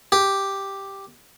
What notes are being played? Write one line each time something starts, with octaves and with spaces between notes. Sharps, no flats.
G4